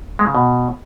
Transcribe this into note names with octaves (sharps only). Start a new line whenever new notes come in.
G#3
C#3
B2